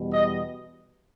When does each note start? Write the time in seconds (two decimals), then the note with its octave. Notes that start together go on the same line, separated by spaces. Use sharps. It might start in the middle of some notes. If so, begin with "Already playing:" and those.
Already playing: E2 B2 G3
0.11 D#5